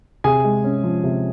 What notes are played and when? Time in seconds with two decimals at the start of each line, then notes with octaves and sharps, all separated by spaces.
0.24 C3 G#4 G#5
0.44 G#3
0.64 C#4
0.84 F3
1.04 C3